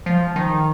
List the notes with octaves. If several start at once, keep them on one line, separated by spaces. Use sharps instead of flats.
F3
D#3